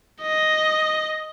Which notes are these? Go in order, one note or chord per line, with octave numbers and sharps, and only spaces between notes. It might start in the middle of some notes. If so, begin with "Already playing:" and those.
D#5